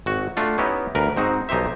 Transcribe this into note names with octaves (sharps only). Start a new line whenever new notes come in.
G#1 F#4
A3 D4 F4 F#4
B3 C#4 D#4 E4 G4
D2 A#4 B4
G#2 C4 D#4 F#4
B1 D#4 G4 C5 E5